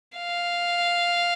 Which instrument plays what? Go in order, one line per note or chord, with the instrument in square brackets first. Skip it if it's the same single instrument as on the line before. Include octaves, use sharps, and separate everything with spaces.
[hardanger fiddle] F5